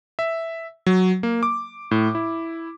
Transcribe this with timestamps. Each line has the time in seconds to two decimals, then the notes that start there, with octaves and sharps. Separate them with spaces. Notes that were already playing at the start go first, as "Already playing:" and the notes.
0.19 E5
0.86 F#3
1.23 A#3
1.43 D6
1.91 A2
2.15 E4